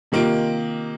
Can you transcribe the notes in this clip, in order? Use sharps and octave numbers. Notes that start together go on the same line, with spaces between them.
C3 D#3 A#3 F4 D7